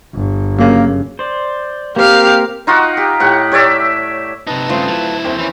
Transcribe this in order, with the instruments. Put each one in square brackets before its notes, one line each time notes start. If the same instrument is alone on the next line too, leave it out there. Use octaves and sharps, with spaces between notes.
[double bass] G1
[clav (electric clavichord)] F#2 C#3 [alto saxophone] A#3
[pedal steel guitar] C5 D5
[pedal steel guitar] A#3 C4 A#4 [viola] G4 F5
[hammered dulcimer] D#4 F4 F#4 F#5
G4
A2 G4 F#5
G4 C#5 D5 E5
[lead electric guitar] C3 D#4 [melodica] B4 A5
[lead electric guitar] G2 C#3 [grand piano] A3 C4 [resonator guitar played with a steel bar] F4
[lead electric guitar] F#3 E4
[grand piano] D#2 C4 [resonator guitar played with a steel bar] A3
[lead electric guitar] E3 [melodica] C#4 E4